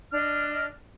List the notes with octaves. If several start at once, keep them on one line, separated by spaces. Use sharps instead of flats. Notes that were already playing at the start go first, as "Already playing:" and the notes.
D4 D#5 F6